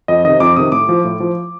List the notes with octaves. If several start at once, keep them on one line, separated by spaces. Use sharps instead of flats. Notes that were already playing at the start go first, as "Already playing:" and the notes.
F2 D#5
C3 D#3 D#5
F2 D6
C3 D#3 D#6
A2 D6
F3
A2
F3